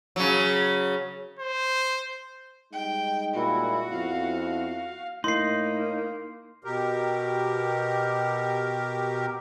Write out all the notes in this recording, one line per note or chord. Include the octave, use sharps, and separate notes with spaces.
C#3 F#3
C5
G3 G#3 D#4 G5
A#2 E4 F#4
F2 B3 E4 F5
A2 A#3 D#4 C6 C7
B2 G4 A#4